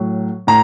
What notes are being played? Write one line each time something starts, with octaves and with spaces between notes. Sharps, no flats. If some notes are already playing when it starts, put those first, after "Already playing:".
Already playing: A2 F#3
A2 A#5